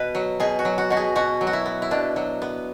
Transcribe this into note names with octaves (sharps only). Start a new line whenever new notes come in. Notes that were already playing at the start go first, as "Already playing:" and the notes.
Already playing: B2 B4
F#3
B2 G#4
F#4
F#3
F#4
B2 F#4
G#4
B2 F#4
F#3
F#4
E4
B3
E4
B2 D4
F#3
B3